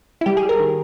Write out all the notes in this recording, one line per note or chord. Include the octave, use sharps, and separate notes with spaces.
E4
G3 G4
G#4
G3
A#4
D#3